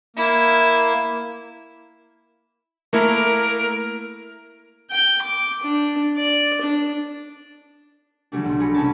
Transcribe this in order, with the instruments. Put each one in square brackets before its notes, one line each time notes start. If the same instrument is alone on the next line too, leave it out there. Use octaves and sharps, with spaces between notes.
[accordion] A#3 [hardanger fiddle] E4
[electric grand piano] A3 A#3 E4 [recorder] A#4
[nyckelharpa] G5
D6
D4
D5
D4
[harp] D3 E3 F#3 G3 A3 D4
B1
F#3 G#4 B5 C#7
G1 C3 G#3 C#4 C#5 A5